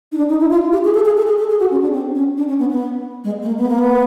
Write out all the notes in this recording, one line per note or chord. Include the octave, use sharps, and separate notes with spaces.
D#4
D4
D#4
E4
F4
G4
G#4
A4
G#4
A4
G#4
A4
G#4
F#4
C#4
D4
C4
C#4
D4
C#4
B3
B3
G#3
A3
A#3
B3
A#3
B3